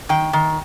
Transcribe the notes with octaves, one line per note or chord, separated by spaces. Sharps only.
D#3 G5
D#3